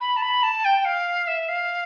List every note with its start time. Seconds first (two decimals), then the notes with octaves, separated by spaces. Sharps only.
0.01 B5
0.16 A5
0.22 B5
0.43 A5
0.65 G5
0.85 F5
1.27 E5
1.48 F5